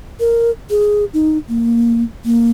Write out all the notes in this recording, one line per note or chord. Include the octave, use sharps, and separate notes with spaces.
A#4
G#4
D#4
A#3
A#3